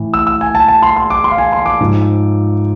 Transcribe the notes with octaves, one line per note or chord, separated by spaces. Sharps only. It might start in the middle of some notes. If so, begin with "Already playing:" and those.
Already playing: A2 E3
E6
E6
G#5
A5
A5
C6
C6
D6
C6
F5
G#5
C6
D6
G#2 F3